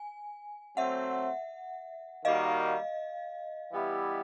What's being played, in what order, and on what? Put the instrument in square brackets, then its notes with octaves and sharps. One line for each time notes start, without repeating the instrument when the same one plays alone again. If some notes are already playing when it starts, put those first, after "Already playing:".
Already playing: [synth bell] G#5
[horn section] F#3 A3 C4 [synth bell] E5 F#5
[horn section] D#3 G3 A#3 D#4 F#4 [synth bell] D#5 F5
[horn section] E3 G3 B3 E4 G4